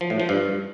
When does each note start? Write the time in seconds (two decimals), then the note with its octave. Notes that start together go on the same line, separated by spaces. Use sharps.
0.01 F3
0.10 A2
0.20 F3
0.29 G2